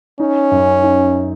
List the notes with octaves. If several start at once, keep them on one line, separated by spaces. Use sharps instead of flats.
C#4 D#4
F#2
D#4